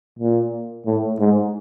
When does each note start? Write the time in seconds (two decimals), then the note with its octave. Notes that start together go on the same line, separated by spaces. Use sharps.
0.19 A#2
0.86 A2
1.20 G#2